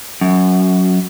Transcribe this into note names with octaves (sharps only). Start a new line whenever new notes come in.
F#2